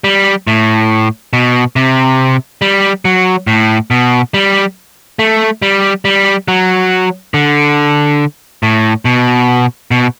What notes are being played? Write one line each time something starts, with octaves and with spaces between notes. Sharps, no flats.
G3
A2
B2
C3
G3
F#3
A2
B2
G3
A3
G3
G3
F#3
D3
A2
B2
B2